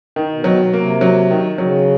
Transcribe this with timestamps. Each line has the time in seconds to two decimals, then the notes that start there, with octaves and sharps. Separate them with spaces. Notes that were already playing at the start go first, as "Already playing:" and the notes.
0.16 D#3
0.31 B2
0.44 F#3
0.73 C3 A#3
1.01 F#3
1.31 D#3
1.58 C#3 F#3